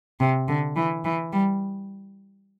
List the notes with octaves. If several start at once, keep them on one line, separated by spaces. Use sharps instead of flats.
C3
D3
E3
E3
G3